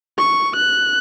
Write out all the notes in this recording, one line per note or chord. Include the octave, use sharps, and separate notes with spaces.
C#6
F#6